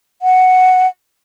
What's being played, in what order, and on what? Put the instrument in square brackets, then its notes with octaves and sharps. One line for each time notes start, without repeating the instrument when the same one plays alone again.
[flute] F#5